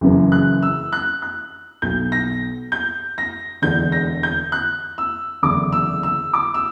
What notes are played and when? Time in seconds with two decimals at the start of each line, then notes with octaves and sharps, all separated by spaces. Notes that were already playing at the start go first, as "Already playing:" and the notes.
0.01 F#1 F#2 C#3 E3
0.32 F#6
0.62 E6
0.92 F#6
1.22 F#6
1.82 B1 B2 G6
2.12 A#6
2.72 G6
3.18 A#6
3.62 E1 E2 D3 G6
3.92 A#6
4.23 G6
4.52 F#6
4.98 E6
5.42 F#1 E2 D3 D6
5.72 E6
6.03 E6
6.33 D6
6.54 E6